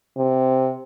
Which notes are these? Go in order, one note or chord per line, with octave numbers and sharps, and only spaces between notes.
C3